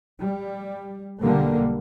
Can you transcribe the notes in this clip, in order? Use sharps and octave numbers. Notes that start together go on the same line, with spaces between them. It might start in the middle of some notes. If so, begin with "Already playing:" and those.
G3
B1 D3 G3 A#3